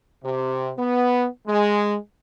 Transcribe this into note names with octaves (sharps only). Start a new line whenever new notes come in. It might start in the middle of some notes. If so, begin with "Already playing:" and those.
C3
B3
G#3